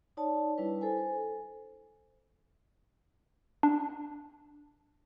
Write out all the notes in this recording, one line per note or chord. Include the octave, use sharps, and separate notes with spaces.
D#4 C#5 D5 A5
G3 D4 E4 B4
A4 C5 G#5
D4